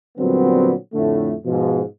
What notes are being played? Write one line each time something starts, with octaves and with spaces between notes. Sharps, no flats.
A#2 D3 F#3 G3 B3 C4
F2 A2 D3 A3
G#2 B2 F3